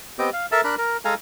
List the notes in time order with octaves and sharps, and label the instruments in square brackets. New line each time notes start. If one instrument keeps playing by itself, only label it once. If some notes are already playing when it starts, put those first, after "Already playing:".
[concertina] B3 C4 G4 D#5 D6
F5
A4 A#4 E5 A5
D4 A#4 B5 F#6
A#4
G#3 A4 F5 G#5 A#5